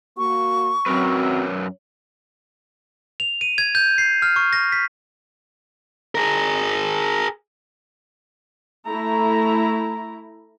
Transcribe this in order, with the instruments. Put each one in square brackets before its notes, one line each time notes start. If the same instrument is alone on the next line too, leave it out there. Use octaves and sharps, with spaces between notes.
[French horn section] A#3 F#4 [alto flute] C#6
[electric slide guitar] F#2 A#4 B4 [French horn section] F#3 [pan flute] C4
[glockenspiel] F7
D#7
G#6
G6
C7
F6
C#6
A#6
B6
[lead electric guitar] G#4 A#4
[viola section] A3 E4 A#5